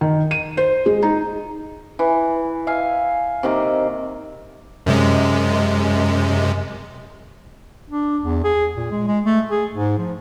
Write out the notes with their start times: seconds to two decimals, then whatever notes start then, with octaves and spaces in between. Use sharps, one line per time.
0.01 D#3
0.31 D#7
0.57 C5
0.86 G#3
1.02 D#4
1.99 E3
2.67 E5 F5 G#5
3.43 C3 D#3 A#3
4.86 F#2 C3 G#3
7.90 D4
8.22 E2
8.44 G#4
8.77 A#2
8.91 G#3
9.08 G#3
9.25 A3
9.51 G#4
9.74 G#2
9.98 F3